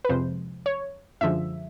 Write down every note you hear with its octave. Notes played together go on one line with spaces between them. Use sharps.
B4
F2 C3 F3 G#3 C5
C#5
F#2 D3 F3 G#3 E5